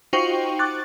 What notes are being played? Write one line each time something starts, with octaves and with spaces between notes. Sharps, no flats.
D#4 F4 F#4 C5 G5 C#6
C#6 D6 F#6 A6